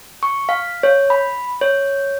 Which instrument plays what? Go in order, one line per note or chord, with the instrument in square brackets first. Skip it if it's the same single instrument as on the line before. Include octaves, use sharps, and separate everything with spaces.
[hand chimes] C#6
F5
C#5
B5
C#5